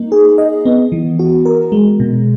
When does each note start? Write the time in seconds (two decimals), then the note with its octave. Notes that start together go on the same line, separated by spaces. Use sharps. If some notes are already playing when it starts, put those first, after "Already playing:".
Already playing: A#3 D#4
0.12 G#4
0.38 D#5
0.65 B3
0.92 E3
1.19 F#4
1.45 A#4
1.72 G#3
2.00 B2